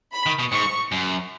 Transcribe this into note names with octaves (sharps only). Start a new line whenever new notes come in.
B5
D#3
B2
G#2 C#6
F#2